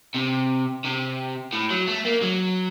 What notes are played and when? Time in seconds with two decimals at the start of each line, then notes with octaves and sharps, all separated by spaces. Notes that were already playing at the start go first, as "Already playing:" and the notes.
0.15 C3
0.85 C3
1.53 A2
1.71 F#3
1.87 A3
2.05 A#3
2.22 F#3